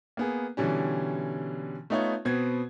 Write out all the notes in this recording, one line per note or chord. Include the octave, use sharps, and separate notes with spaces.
A#3 B3 G#4
B2 D3 E3 G3 C#4
A3 B3 D#4 F4 C#5
B2 B3 C4 G#6